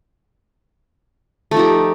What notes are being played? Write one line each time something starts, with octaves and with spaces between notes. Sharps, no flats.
F3 A3 D#4 G4